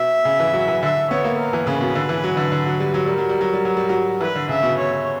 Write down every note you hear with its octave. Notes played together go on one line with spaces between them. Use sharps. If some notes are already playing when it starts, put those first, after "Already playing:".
Already playing: B2 E5
C#3
E3
F#3
E3
D3 E5
B3 C#5
A#3
A#4
E3
C#3 B4
B2
D3
E3
F#3
D3
D3
F#3
G3
F#3
G3 A#4
F#3
G3
F#3
G3
F#3
G3
F#3
E3 B4
D3
C#3 E5
B2
C#5